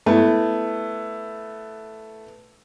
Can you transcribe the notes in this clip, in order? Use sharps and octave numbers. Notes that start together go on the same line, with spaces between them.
A3 B3 E4